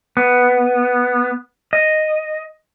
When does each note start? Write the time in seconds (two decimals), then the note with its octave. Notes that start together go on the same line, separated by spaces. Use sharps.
0.17 B3
1.73 D#5